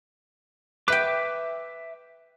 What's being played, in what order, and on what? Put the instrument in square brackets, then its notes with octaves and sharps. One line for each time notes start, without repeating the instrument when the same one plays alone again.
[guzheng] B4 G5 [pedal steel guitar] E5 D6